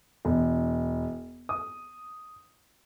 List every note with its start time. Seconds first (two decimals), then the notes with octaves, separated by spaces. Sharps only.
0.25 E1
1.49 D#6